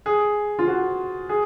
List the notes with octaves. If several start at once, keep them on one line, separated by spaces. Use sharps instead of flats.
G#4
F4
F#4
G#4